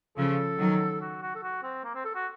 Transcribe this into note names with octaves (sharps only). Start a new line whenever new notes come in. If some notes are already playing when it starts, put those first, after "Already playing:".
C#3 F3 A4
D#3 F#3
F#4
F#4
A4
F#4
C4
A#3
C4
A4
F#4